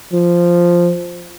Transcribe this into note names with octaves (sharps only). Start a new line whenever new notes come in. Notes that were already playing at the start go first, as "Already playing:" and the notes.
F3